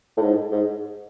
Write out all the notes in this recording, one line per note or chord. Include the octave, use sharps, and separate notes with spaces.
A2
G#2
G#2